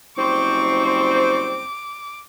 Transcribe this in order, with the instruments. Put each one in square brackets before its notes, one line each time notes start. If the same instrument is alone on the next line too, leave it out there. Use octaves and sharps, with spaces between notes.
[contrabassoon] F#1 [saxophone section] G3 C4 C5 [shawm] C#6 [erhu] D6